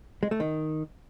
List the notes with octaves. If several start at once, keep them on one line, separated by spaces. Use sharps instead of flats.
G#3
A3
D#3